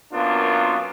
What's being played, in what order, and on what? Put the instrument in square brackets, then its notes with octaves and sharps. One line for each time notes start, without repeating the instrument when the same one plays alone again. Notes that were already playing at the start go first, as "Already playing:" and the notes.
[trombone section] F#2 A#3 B3 D4 F4